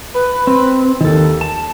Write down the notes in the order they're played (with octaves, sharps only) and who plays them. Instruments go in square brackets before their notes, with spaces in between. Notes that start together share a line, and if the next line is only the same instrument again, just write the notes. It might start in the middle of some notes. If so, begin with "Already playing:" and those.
[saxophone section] B4
[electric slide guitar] C4
[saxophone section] D#2 [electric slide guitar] D#3 A4
[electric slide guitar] A5